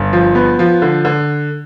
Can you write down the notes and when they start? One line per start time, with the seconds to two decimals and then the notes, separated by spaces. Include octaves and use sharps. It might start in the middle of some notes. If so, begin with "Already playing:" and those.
Already playing: G1
0.13 F3
0.35 B3
0.59 F3
0.82 D3
1.05 D3